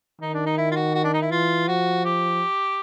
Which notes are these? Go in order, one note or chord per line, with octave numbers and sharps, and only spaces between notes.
D#3 D#4
D4
D#4
E4
F4
F#4
F#4
D4
D#4
E4
E3 F4
F3 F#4
G4